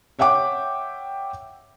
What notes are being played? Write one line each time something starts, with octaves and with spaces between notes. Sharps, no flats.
C#5 E5 F#5 G5 D6